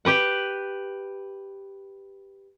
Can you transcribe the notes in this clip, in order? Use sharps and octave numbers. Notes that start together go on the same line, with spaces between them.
G4 B4 F#5